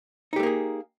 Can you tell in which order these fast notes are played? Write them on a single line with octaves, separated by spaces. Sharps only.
D#4 G4 A3 A#3 G#4